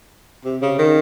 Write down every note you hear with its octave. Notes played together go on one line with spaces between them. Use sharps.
C3
C#3
D#3